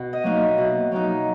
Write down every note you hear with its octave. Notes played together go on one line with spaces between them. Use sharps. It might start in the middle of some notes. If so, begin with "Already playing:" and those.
Already playing: B2
D#5
F#3 A#3 D#4
E5
B2
F#3 A#3 D#4